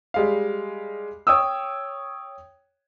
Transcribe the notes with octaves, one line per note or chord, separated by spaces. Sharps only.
G3 G#3 F5
C#5 G5 D#6 E6